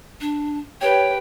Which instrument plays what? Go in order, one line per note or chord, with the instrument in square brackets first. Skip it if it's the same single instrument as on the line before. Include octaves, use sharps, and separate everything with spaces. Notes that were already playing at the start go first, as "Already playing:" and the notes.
[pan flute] D4
[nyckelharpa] G4 B4 [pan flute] C#5 [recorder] G5